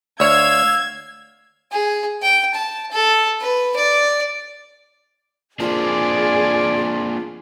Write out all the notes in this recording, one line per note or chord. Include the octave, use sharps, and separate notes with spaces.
D2 C#5 F5 E6 G#6
G#4
G5
A5
A4
B4
D5
A#3 C4 D4 F4 G#4 D5